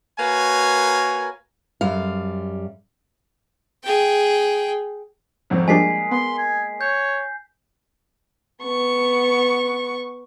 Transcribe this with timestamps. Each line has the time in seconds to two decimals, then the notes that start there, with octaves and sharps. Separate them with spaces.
0.19 A#3 F#4 A#4 B4 C#5 G#5
1.81 F#2 G3 F5
3.84 G#4 G5
5.50 G#1 F2 C4
5.68 F3 G3 G#3 A#3 D4 G#5 B6 C7
6.11 B3 C6
6.38 G#5
6.81 C#5 G6
8.63 B3 C#6